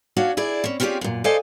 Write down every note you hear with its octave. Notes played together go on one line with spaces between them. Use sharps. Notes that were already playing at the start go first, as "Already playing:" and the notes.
C#4 D4 F#4 C#5 F5
E4 G#4 D5
C4 C#4
C4 C#4 F4 G4 G#4 D5
F#2 A#2
A4 C5 D5 D#5 F5 G#5